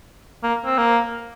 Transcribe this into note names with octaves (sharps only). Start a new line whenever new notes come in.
A#3
C4
A#3